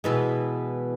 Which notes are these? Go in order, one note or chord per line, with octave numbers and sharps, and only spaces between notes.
B2 E3 G#3